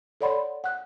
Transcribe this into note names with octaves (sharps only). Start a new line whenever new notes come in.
A4 C#5 D5 F#5 B5 C6
F#5 F#6